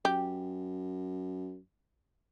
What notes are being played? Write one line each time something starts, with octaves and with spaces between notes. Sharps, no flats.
F#2 G4